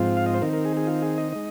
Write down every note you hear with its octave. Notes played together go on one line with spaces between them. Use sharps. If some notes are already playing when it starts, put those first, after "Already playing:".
Already playing: G#2 F3 C4 F4
F5
D#5
C5
D#3 C4 D#4 A#4
A#4
G#4
G#4
F4
G#4
D#5
G#3 D#4